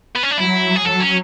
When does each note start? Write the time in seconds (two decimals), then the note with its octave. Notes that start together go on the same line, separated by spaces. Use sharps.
0.16 B3
0.23 C#4
0.31 D4
0.38 F#3 E4
0.76 G#4
0.85 F#3 A4
1.00 C#4